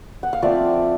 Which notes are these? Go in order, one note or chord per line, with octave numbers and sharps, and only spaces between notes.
F#5
F5
F3 A3 C4 D5 E5